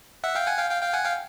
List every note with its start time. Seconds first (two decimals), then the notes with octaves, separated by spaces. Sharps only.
0.24 E5 F#5
0.35 F5 G5
0.47 F#5 G#5
0.58 F5 G5
0.70 F5 G5
0.82 F5 G5
0.93 F#5 G#5
1.05 F5 G5